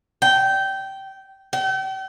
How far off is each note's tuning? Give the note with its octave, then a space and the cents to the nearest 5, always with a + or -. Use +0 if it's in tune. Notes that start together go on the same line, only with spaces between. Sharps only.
G5 -15
G5 -40